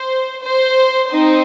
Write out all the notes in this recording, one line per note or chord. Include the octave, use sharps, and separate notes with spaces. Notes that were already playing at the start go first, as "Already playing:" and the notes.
Already playing: C5
C5
C4 D#4 C5